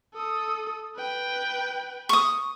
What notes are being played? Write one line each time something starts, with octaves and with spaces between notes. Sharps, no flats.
A4 D#6
B4 G5
C#6 D#6